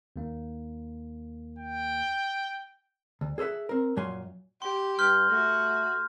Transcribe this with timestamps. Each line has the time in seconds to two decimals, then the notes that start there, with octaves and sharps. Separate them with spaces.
0.16 D#2 A#3
1.58 G5
3.21 D2
3.38 G#4 A4 C5 E5 F#5
3.69 C4 A#4
3.96 F#2 A#2 F#3 F5 G#5 C6
4.62 G4 C6
4.99 G2 C6 F6 G6
5.30 A3 F#4